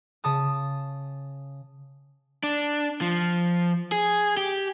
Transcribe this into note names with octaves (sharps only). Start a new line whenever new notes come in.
C#3 A5 D#6
D4
F3
G#4
G4